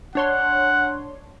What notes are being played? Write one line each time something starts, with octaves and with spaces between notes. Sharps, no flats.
D4 C#5 F#5 C6